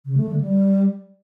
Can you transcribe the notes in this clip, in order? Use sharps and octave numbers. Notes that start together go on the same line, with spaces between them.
C#3
A3
D3
G3